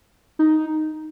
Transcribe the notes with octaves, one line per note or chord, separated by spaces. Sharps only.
D#4